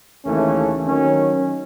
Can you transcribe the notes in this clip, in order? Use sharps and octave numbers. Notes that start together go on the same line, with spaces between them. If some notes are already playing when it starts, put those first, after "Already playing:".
D#2 C#3 E3 A3 C#4
D#3 F#3 C#4